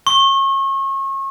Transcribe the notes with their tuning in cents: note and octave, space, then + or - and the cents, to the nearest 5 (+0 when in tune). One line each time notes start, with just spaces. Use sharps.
C#6 -35